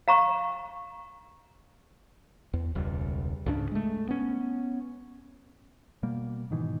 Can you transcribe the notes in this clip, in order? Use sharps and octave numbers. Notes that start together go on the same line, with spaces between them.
F5 A#5 C#6
E2
E1 C#2 G3
C#2 G#2 C#3 D4
G#3 A3
B3 C#4
B2 G3 A#3
G#2 B2 D#3 E3